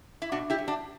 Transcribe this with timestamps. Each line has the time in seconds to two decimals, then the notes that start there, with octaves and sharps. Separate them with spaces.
0.22 E4
0.32 B2 D4 F#4
0.50 E4 G4
0.58 F#3
0.68 D4 F#4